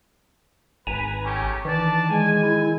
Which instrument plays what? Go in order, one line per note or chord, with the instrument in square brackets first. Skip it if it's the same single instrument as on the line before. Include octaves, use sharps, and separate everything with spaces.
[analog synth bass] G#1 [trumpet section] B4 [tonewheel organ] G#5 A#5
[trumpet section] A3 C#4 G4
[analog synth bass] D#3 [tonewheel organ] E3 [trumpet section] D4 D5 A5
[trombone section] G#3 [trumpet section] G#5
[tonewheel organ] E4